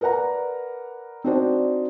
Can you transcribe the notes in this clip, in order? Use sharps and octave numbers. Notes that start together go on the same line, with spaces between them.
A#4 B4 D5 F#5 A#5
C4 D4 D#4 F#4 C5 D5